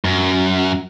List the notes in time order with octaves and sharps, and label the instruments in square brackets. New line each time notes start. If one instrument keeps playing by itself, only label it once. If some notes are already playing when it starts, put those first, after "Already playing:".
[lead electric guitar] F#2